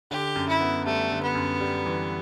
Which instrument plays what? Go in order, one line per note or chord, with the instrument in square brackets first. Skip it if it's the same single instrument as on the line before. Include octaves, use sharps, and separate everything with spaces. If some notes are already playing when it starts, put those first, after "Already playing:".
[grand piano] D3 [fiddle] G4
[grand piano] F#2
[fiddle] E4
[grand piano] B3
[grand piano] G3 [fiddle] A3
[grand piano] D3
[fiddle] B3
[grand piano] F#2
G3
E3